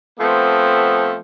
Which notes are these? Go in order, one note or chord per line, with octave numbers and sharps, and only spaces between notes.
F3 A3 B3 C4